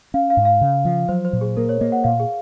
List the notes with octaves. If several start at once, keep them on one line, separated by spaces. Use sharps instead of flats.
C#4 F5
F5
G#2
F5
C#3
F3
F#3 C5
C5
A#2
G#4
A#3 A#4
C#5
A#3 D#5
F#5
A#2 F5
G#4